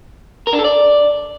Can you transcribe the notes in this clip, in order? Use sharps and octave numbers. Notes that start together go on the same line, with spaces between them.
A#4
D4
A4
D5